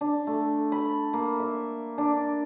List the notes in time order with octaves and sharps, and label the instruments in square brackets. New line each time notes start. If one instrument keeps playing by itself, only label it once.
[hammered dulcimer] D4
A3
B5
A#3
E5
D4